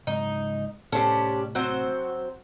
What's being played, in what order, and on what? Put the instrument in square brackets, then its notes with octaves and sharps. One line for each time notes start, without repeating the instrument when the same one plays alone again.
[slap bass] G#2 C#3 F#3 [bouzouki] D#4
[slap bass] A2 C3 [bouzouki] C#4 D4 G4 [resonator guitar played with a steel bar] A4 C5
[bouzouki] F#3 C4 C5 [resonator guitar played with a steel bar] F#4